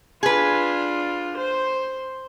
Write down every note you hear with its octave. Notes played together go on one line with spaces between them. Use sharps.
D4 F4 G#4 B4
C5